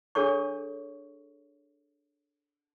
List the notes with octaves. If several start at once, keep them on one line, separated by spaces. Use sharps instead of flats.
D4 G#4 A4 C#5 C#6